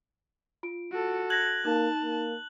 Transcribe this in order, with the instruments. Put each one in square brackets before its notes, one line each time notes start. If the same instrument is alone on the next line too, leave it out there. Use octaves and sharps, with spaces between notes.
[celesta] F4 D7
[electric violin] F#4 A4
[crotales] F#6 F#7 [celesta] G#6 A#6
[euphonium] A#3 [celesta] D#4 [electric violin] A5
[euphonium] A#3